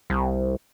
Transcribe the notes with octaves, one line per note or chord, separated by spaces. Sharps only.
C2